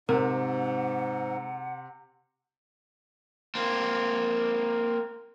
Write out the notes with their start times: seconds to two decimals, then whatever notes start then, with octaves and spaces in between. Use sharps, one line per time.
0.09 G#2 C3 A#4 F#5
3.55 A#3 C4